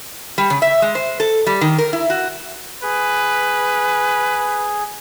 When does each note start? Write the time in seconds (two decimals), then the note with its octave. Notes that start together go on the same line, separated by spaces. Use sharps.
0.38 G3
0.50 C#3
0.62 E5
0.82 G#3
0.95 C5
1.20 A4
1.47 G3
1.61 D#3
1.78 A#4
1.93 E4
2.10 F#4
2.83 G#4 B4